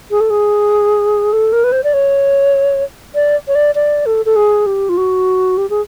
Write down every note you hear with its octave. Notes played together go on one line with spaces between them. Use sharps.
G#4
A4
G#4
A4
A#4
B4
C5
D5
C#5
D5
C#5
D5
D5
A4
A4
G#4
G4
F4
F#4
G4
G#4